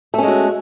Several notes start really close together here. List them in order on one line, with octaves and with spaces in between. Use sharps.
A3 C#4 G#3 F#4